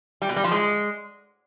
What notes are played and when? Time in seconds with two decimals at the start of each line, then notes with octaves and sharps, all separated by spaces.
0.22 G3
0.29 B2
0.37 G3
0.44 F3
0.52 G#3